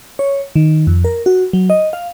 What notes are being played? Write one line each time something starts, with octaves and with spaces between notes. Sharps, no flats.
C#5
D#3
F2
A#4
F#4
F#3
D#5
F5